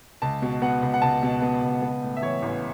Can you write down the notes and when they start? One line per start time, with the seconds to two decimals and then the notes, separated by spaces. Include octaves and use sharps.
0.22 C#2 A5
0.42 B2
0.62 B3 F#5
0.82 C#2
0.94 F#5
1.02 C#2 A5
1.22 B2
1.42 B3
1.63 C#2
1.82 B3
2.02 A2
2.17 E5
2.22 E3 C#5
2.42 A1